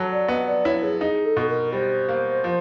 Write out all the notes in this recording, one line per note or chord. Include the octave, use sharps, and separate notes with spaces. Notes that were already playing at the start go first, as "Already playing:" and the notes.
Already playing: F#3 A4
D5
B3 D#5
D5
E4 C#5
G#4
D#4 G#4
A4
B2 A4
A#4
G3 C5
A#3
F3